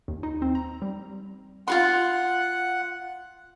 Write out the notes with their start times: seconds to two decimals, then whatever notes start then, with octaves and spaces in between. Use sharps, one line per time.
0.08 D#2
0.23 D#4
0.42 C4
0.55 A#5
0.82 G3
1.68 F4 F#4 F#5 C6